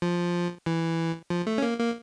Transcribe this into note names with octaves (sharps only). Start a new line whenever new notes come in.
F3
E3
F3
A3
C#4
A#3
A#3